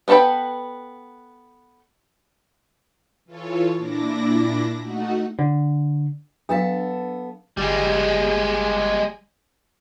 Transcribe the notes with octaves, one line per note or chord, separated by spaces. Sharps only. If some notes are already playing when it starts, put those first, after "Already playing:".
B3 D4 A4 B4 G5
E3 F4 A4 C#5
A#2 D4 E4 D6 A#6
A3 D#4 F#4 F#5
D3
F#3 B3 D4 A4 F5 A5
G1 G3 G#3